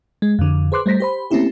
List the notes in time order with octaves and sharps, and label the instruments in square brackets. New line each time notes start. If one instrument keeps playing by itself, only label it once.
[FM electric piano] G#3
F2 D3
G#4 B4 C5 C6 D6 F#6
G3 A3 C5 A#6 B6
G4 C5 B5
A3 A#3 C4 C#4 E4 G4